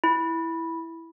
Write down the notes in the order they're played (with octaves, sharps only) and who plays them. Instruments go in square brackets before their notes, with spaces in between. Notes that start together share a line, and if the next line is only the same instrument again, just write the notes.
[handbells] E4